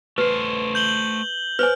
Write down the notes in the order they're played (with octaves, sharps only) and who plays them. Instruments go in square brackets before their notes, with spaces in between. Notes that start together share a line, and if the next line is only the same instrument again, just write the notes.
[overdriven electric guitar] A3 C5 [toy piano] B4
[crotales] G6 F#7 G7
[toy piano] B4 C5 G#5 [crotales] F6